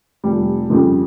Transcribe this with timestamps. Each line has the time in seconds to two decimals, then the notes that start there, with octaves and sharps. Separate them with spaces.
0.24 F1 G3
0.70 F2 C#3 F3 G3